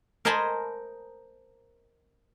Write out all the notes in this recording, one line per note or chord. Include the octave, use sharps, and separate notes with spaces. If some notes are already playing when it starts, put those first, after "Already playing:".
A#4 C5 D#5 G#5 A5 B5